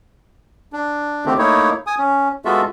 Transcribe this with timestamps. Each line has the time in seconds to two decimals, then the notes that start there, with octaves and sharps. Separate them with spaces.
0.73 D4
1.25 D3 D#3 A3 C4 G4
1.38 A3 A#3 D#4 E4 C#5
1.87 G#5 D#6
1.98 C#4
2.45 G#3 B3 F4 F#4 A4 E5